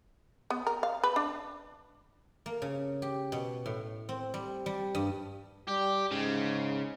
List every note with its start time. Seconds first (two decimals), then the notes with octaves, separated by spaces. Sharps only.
0.50 B3
0.67 A#4
0.83 F5
1.04 B4
1.16 D4
2.46 A#3
2.62 C#3
3.02 G4
3.32 B2
3.66 A2
4.09 C4
4.34 G3
4.66 G3
4.95 G2
5.68 G3 G4
6.11 G#2 C#3